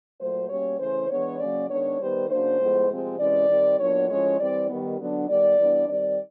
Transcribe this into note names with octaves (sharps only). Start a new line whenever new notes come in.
A#2 F#3 A3 C5
B2 G3 A#3 C#4 C#5
C#3 E3 A3 C#4 C5
E3 G#3 B3 D4 C#5
C#3 F#3 A#3 C#4 D5
D#3 G#3 B3 D4 C#5
D#3 G3 B3 C5
C#3 F#3 A#3 D4 C5
A2 F3 G#3 B3
C3 F3 G#3 C4
C3 E3 G#3 C#4 D5
D#3 G3 C4
A#2 F#3 B3 D4 C#5
A2 F3 G#3 C#4 C#5
E3 G3 C4 D5
D#3 G3 B3
D3 F#3 B3 D4
D#3 G3 B3 D5
E3 G3 B3 D4
D#3 G3 C4 D5